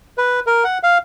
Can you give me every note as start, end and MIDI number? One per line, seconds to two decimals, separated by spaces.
0.18 0.40 71
0.47 0.64 70
0.64 0.78 78
0.83 0.98 77